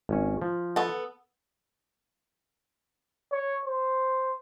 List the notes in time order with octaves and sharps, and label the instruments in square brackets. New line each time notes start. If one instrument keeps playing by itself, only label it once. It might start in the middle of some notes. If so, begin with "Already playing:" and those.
[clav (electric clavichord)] G#1 C#4
F3
[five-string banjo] B3 A4
[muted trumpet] C#5
C5